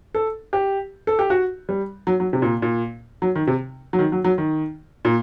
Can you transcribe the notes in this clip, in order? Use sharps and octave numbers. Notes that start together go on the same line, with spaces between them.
A4
G4
A4
G4
F#4
G3
F#3
F#3
C3
A#2
A#2
F#3
D#3
C3
F#3
D#3
F#3
F#3
D#3
A#2